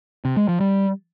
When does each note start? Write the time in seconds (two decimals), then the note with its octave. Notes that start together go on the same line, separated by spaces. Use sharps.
0.25 C3
0.37 G#3
0.48 F3
0.60 G3